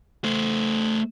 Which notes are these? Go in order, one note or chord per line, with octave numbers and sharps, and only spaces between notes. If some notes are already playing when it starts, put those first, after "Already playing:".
A3 C5